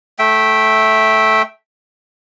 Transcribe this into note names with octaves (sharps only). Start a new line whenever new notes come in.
A3 E5 G5